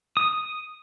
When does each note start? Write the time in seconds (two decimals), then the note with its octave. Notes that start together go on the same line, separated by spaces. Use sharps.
0.17 D#6